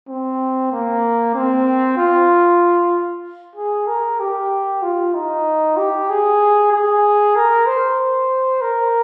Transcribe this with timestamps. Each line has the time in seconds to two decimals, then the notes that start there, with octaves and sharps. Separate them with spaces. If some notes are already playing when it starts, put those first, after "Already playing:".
0.08 C4
0.72 A#3
1.35 C4
1.97 F4
3.55 G#4
3.87 A#4
4.20 G4
4.83 F4
5.14 D#4
5.77 G4
6.09 G#4
6.72 G#4
7.36 A#4
7.67 C5
8.62 A#4